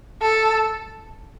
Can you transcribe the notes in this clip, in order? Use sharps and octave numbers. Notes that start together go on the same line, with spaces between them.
A4